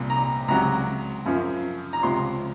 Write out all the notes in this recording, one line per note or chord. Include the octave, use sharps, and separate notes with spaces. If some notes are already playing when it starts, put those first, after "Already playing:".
Already playing: C2 A#2 F3
A#5
C#2 C3 F#3 A#5
F#2 C#3 F3
A#5
C#2 C3 F3 C6